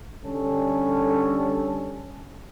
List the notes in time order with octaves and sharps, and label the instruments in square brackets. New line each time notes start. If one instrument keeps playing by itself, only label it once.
[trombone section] D3 G3 C#4 A4